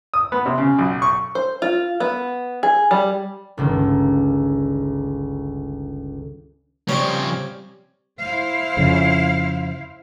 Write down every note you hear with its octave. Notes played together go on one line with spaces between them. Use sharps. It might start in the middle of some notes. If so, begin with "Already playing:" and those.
D#6
B3
C3
C#3
B1
C#6
C5
F4
B3
G#4
G3
G1 C#2 D#3
C#3 F3 G3 C4 C#4 C#5
E4 C5 F5
F2 C#3